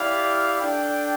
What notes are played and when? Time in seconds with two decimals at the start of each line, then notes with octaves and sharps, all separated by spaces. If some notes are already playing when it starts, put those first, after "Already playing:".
Already playing: E4 G4 D5 F5
0.60 D4 A4 D5 G5